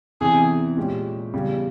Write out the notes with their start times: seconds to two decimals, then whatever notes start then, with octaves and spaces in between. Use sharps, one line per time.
0.21 E2 C3 E3 G#4
0.77 A#2 G#3 C#4 G4
1.33 E2 C#3 G3